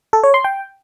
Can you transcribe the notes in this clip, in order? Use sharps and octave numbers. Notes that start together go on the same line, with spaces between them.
A4
C#5
C6
G5